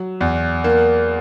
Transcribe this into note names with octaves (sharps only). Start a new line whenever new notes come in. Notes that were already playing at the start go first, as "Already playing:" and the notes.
Already playing: F#3
E2
A#3